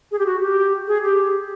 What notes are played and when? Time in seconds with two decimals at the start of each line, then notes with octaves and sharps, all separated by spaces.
0.12 G#4
0.19 G4
0.26 F#4
0.41 G4
0.87 G#4
1.03 G4